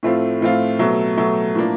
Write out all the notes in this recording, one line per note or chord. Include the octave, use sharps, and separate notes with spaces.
A2 F3 A3 C4 F4
A2 F3 A3 C4 F4
B2 F#3 A3
B2 F#3 A3
A2 F3 A#3 D4